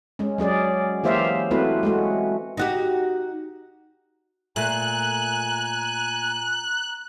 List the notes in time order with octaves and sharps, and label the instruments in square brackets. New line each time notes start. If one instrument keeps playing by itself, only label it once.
[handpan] G#3 C#4
F#3 C#4 G#4 D5
E3 A#3 G4 C5 E5 F5
A3 C4 E4 F#4 B4
G#3 A3 F#4
[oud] D#4 F#4 G4
[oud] A#2 A3 [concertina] G#5 [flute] A#5 [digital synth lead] F#6